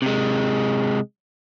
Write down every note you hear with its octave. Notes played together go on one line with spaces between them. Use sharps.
C3 G#3